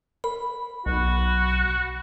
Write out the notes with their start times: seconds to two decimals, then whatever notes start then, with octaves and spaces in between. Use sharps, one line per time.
0.24 A#4 B5
0.86 B1 F#4